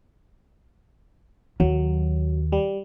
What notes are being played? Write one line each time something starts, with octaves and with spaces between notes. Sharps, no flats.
D#2 F#3
G3